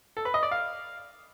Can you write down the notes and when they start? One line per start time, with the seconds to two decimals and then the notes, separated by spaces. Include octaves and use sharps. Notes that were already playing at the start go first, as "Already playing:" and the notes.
0.17 A4
0.25 B4
0.34 D#5
0.43 D5
0.52 F5